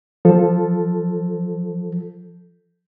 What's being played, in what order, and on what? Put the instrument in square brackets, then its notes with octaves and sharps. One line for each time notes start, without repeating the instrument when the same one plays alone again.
[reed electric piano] F3 A4